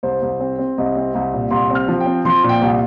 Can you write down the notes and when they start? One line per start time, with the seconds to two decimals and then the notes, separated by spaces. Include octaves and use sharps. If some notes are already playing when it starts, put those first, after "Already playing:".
0.03 C2 C5
0.22 C2
0.40 C4
0.58 C4
0.78 C2 D#5
0.96 C4
1.15 C2
1.33 A#2
1.51 C2 C6
1.70 C4 F6
1.88 F3
2.00 G5
2.06 C4
2.25 F3 C6
2.43 A#2
2.49 G5
2.62 C2